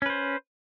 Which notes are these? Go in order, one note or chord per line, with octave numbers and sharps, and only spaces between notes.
C#4 B4 C5